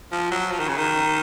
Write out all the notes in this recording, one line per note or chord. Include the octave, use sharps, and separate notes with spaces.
F3
F#3
F3
D#3
C#3
D#3